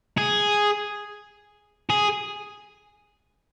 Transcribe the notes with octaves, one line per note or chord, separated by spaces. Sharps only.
G#4
G#4